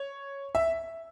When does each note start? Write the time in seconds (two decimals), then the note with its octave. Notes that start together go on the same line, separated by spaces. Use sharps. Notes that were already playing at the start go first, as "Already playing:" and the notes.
Already playing: C#5
0.55 E5